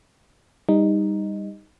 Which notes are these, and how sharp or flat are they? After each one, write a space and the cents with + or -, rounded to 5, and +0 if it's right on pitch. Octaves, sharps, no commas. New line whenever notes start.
G3 +20 D#4 +0